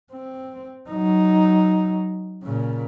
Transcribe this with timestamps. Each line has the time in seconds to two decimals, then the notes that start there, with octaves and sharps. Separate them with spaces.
0.13 C4
0.90 F#3 D#4
2.44 A#2 C#3